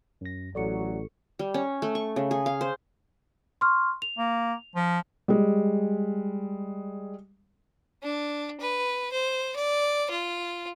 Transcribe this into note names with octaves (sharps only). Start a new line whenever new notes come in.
F#2 A#6
A1 F#3 A4 D5 C#6 C#7
G3
C#4
A3
C#6
C#3
G#4
F5
C5
C6 C#6 F6
F7
A#3
F3
G3 G#3
D4
B4
C5
D5
F4